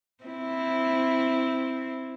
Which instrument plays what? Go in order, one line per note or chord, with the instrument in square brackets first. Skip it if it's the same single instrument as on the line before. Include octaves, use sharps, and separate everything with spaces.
[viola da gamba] C4 E4